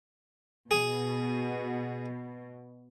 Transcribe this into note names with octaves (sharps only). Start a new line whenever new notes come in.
B2 G#4 G#5